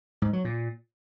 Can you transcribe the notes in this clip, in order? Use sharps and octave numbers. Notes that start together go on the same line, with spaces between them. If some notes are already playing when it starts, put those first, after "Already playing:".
G#2
F#3
A#2